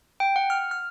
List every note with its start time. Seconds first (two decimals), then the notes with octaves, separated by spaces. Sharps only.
0.20 G5
0.36 F#5
0.50 F6
0.71 F6